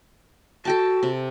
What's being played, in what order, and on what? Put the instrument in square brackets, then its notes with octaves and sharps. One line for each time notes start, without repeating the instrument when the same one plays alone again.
[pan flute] F#4 [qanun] A4 G5 A5
[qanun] C3